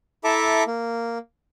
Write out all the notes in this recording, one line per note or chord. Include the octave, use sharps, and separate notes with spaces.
E4 A4 E5 A5 A#5 D6
A#3